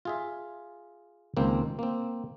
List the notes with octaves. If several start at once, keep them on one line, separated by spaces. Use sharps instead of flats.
F4 G#4 E5
C#2 D#3 A#3 C4
A#3 C4